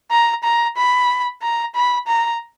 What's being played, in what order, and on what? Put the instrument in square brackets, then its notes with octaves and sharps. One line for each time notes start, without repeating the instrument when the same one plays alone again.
[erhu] A#5
A#5
B5
A#5
B5
A#5